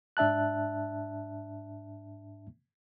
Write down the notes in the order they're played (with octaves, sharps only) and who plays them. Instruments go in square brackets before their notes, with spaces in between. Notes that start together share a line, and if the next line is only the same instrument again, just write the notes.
[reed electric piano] G#2 D4 E5 A5 F#6